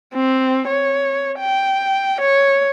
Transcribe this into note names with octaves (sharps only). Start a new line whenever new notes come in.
C4
C#5
G5
C#5